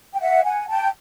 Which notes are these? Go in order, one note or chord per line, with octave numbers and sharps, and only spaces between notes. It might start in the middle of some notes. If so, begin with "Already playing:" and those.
G5
E5 F#5
F#5 G#5
G5 A5